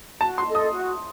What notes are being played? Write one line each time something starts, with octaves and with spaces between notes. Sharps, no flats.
F#4 A5
C6
A4 D#5
D#6
F#4